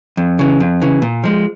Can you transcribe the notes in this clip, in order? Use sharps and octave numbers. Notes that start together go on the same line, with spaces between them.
F2
C#3 E3
F2
C#3 E3
A#2
F3 G#3